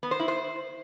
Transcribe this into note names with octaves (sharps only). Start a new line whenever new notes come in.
B3
C5
E4
C5